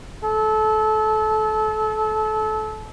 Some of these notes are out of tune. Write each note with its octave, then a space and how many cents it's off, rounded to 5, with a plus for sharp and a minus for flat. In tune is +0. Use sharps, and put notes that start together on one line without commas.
A4 -25